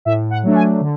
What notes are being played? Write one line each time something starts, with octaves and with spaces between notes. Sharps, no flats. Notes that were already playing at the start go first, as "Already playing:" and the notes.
A2 E5
F#5
F#3 A3 D4
G#5
D3